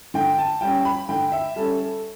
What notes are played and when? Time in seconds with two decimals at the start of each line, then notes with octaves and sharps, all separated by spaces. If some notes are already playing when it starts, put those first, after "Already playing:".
0.14 D3 G5
0.38 A5
0.61 G3 C#4 G5
0.85 B5
1.09 D3 G5
1.32 E5
1.56 G3 C#4 A4
1.79 A4